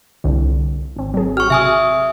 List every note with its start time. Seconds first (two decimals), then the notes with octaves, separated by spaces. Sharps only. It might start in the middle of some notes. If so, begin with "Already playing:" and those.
0.24 C2 D3
0.96 G#1 C4
1.14 F#3 G#4
1.37 F#4 C#6 F6
1.50 C3 E5 G#5 D#6